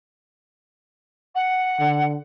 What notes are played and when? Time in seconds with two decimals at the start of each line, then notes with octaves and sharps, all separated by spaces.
1.35 F#5
1.80 D3